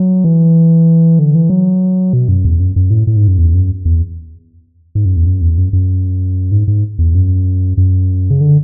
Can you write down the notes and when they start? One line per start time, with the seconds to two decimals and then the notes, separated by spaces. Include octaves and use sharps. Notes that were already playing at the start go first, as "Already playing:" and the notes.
Already playing: F#3
0.24 E3
1.19 D3
1.35 E3
1.50 F#3
2.13 B2
2.28 F#2
2.45 E2
2.60 F#2
2.76 F#2
2.90 A2
3.07 A2
3.17 G#2
3.28 F#2
3.38 E2
3.54 F#2
3.85 E2
4.95 G#2
5.05 F#2
5.16 E2
5.26 F#2
5.42 E2
5.58 F#2
5.73 F#2
6.52 G#2
6.68 G#2
6.99 E2
7.15 F#2
7.77 F#2
8.30 C#3
8.41 D3